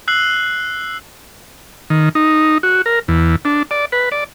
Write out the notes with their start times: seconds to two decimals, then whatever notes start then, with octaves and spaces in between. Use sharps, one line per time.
0.08 E6 F#6 C7 F#7
1.90 D#3
2.15 D#4
2.63 F#4
2.86 A#4
3.08 E2
3.45 D4
3.71 D5
3.92 B4
4.12 D5